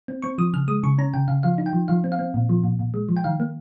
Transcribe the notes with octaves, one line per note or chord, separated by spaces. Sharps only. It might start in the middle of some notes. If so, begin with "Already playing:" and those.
C4
C4 C#6
F3 D#6
C#3 F6
G#3 D#6
C#3 C#6
C#4 A#5
C#3 G5
C#3 F5
F3 F5
D#4
G5
F3
F3 F5
C4
F5
C4
A#2
F3
A#2
A#2
G#3
F3
G5
D#3 F5
A#3